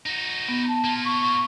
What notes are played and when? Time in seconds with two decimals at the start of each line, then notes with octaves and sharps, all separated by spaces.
0.06 D#4 F#4
0.49 B3
0.69 A5
0.84 A#3 F4
1.05 C#6